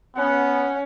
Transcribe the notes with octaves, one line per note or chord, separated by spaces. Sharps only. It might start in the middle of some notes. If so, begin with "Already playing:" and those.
B3 C#4 F#5